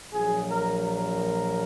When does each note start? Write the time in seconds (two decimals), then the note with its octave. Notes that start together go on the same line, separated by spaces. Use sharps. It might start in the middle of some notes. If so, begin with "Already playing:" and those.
0.12 A#1 A#2 F#3 G#4
0.49 A#4
0.85 A#4